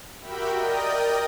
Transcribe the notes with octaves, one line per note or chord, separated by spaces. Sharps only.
F#4 G4 A#4 E5 G5 B5
A#4 D5 D#5 G5 D#6